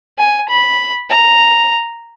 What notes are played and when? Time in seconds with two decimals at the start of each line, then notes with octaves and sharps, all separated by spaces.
0.18 G#5
0.48 B5
1.09 A#5